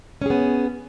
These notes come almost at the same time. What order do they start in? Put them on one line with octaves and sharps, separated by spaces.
C#4 G#4 B3